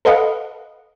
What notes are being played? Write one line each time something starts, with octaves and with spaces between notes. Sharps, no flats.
A4 B4 D#5 F5 F#5